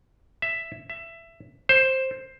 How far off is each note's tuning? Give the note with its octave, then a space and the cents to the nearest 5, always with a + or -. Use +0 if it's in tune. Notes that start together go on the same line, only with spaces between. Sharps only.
E5 +5
E5 +15
C5 +10